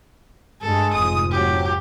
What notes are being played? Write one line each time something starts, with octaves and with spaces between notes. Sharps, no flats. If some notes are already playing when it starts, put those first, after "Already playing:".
G2 G#3 A4
F1 G#2 F3 D#6
F#3 G4